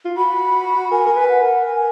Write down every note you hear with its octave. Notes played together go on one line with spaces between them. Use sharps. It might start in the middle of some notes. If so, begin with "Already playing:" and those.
F4
F#4 B5
A#4 G#5
A#4
B4
F#5
A#4
G#5